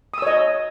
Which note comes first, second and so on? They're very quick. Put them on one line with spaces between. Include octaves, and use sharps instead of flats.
D#6 E6 C#5 D#5